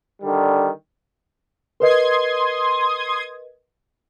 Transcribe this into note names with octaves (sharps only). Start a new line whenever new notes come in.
D3 D#3 G3
A#4 B4 D#5 C6 D#6 G#6